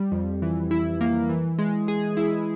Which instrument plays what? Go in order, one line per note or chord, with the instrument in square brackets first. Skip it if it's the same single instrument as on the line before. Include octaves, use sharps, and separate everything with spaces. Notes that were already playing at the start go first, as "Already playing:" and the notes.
Already playing: [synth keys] G3
F2
E3
E4
A#3
E3
G#3
G#4
E4